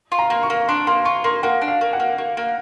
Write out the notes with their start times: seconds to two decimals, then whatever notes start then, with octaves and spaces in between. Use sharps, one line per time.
0.12 F4
0.19 A#5
0.30 A#3
0.43 C#6
0.50 A#3
0.68 D4 C6
0.87 A#3 C6
1.05 F4 C#6
1.24 A#3 C6
1.43 A#3 F#5
1.61 D4
1.68 F5
1.81 A#3
1.93 F#5
2.00 A#3
2.18 A#3
2.37 A#3